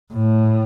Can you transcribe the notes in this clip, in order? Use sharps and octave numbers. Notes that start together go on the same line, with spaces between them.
A2